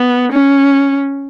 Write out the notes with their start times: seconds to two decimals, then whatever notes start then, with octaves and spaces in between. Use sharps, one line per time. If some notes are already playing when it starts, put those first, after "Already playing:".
Already playing: B3
0.33 C#4